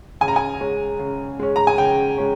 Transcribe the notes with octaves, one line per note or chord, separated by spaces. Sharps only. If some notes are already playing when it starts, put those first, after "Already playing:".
C#3 G#5
A#5
G#5
G#3 C#4
C#3
G#3 C#4
A#5
G#5
C#3 G5
G#3 C#4